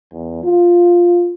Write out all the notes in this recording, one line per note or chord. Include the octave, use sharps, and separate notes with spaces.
E2
F4